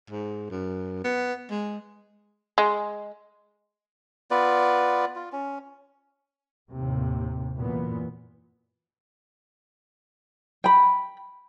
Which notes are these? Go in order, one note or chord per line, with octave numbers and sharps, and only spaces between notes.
G#2
F#2
B3
G#3
G#3
B3 F4 B4 D5
F4
C#4
D#2 A2 C3
F#2 A#2 E3 B3
G5 B5